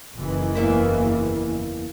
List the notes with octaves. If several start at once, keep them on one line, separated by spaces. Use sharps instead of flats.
F#1 D#3 E3
E2 A#3 E5